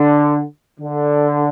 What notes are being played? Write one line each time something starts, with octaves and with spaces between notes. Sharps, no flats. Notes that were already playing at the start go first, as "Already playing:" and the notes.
Already playing: D3
D3